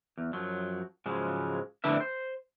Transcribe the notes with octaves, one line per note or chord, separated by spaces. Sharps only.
E2
F#2 F3 F#3
G#2 C#3 F3 F#3 G#3
F2 A2 D3 D4 B4 E5
C5